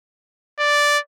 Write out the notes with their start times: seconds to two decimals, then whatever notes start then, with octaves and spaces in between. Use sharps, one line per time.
0.59 D5